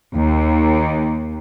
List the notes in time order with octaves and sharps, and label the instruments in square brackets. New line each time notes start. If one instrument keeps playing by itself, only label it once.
[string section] D#2